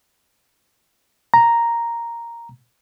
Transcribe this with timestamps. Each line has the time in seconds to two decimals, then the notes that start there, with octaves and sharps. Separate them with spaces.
1.34 A#5